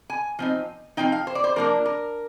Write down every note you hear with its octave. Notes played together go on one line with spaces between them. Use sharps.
G#5
F3 C4 D#4
F3 C4 D#4 G5
F5
C5
D5
C5
F3 A#3 D4 A#4
A#4